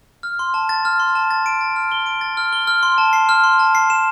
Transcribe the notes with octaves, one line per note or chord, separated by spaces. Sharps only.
F6
C6
A5
A6
F6
C6
A5
A6
D7
A6
F6
G7
D7
A6
F6
G7
F6
C6
A5
C7
F6
C6
A5
C7
E7